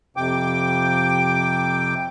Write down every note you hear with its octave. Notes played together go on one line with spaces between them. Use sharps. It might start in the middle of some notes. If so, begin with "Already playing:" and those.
F2 C3 G5 D6